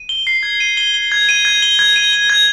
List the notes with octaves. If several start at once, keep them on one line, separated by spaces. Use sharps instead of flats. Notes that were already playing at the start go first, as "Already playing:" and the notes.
Already playing: D#7
G7
C7
G#6
D#7
G7
G7
G#6
D#7
G#6
G7
G#6
D#7
G7
G#6